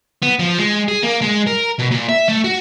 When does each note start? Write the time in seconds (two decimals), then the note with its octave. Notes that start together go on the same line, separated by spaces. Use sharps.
0.23 B3
0.39 F3
0.58 G#3
0.88 G#4
1.03 A#3
1.21 G#3
1.47 A#4
1.79 B2
1.91 A#2
2.09 E5
2.28 A3
2.44 F#4